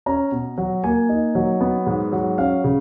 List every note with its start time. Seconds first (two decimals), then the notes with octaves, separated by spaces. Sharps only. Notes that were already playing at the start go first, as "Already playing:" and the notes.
0.06 C#4 A#5
0.32 B2
0.58 F#3
0.84 A#3 G#5
1.09 D#4
1.35 F#3
1.61 B3
1.86 G#2
2.12 F#3
2.38 C#4 F5
2.64 C#3